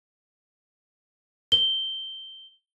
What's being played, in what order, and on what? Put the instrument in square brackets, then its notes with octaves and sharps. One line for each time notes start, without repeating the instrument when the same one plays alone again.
[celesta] G7